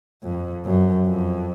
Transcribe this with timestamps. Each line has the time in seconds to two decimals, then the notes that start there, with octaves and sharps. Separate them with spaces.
0.23 F2
0.65 F#2
1.06 F2